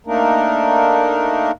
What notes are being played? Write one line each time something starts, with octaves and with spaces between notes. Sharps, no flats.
A3 A#3 D4 D#4 A#4